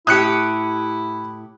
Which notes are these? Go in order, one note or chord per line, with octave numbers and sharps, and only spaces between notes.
A2 E4 G4 D#6 F#6 C#7